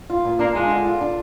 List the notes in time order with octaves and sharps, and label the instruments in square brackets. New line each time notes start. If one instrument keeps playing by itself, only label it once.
[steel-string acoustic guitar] F4
A#2
[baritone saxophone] A#3 [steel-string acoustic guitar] D4
[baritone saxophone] G#3 [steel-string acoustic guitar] F4
[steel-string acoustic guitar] D3
F4
D4